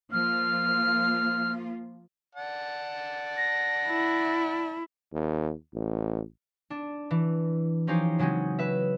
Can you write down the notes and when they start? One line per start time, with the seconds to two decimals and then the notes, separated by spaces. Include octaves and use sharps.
0.12 F3 A#3 F4 F6
2.35 D5 F#5 A5
3.37 A#6
3.89 E4
5.13 D#2
5.74 A1
6.70 D4
7.11 E3
7.87 F3 C#4 D#4 G4 C5
8.18 C#3 F#3 G#3 C4 C#4
8.59 B4 E5